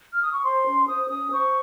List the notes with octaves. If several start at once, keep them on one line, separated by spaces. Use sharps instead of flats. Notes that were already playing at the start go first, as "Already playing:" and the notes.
F6
D#6
C#6
C5 C6
C#4
C5 D#6
C#4 D#6
C5 C#6